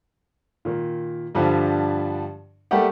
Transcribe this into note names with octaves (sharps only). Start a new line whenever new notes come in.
A#2 D#3
G2 D3 F3 G3 D4
G3 A3 A#3 G4 F#5